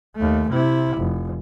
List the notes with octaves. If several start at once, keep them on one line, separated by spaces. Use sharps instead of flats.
D#2 A3
C3 E4
F1